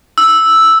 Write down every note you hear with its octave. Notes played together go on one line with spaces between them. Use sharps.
E6